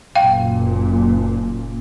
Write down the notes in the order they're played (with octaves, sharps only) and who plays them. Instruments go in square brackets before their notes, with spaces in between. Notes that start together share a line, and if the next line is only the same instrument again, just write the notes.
[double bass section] F#1 A#2 [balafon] F5 G5